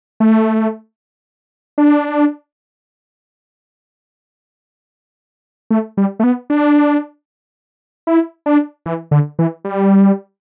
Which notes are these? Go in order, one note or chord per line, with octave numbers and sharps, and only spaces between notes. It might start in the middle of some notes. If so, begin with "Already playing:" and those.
A3
D4
A3
G3
A3
B3
D4
E4
D4
E3
D3
E3
G3